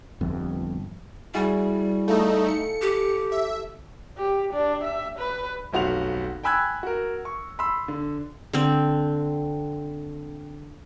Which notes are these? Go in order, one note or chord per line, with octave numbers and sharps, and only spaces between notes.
G1 F2
G3 E4 F#4 G#4
A3 D#4 A4 F5
C#7
G4
E5
G4
D4
E5
B4
F1 B1 F#4 F5 F7
G5 G#5 B5 E6 F#6 G#6
F#4 A#4
C#6
B5 C6 E6
D3
D3 C4